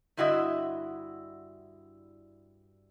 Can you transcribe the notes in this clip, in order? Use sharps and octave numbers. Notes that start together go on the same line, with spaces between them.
G2 D3 E4 F#4 D#5 E5